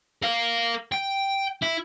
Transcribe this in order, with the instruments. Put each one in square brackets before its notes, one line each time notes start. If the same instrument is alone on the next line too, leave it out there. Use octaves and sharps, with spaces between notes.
[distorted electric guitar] A#4 F5
G5
E4